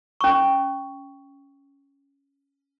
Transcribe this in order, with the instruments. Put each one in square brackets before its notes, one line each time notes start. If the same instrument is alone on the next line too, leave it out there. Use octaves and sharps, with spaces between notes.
[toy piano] C#4 C#6